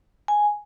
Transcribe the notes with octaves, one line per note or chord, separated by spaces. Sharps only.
G#5